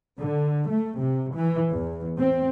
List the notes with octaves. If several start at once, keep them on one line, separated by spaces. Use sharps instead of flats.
D3
A3
C3
E3
E2
C4